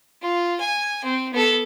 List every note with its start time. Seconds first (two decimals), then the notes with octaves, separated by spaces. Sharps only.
0.22 F4
0.60 G#5
1.04 C4
1.33 B3 A4